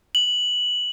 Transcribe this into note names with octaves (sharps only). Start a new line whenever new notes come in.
F#7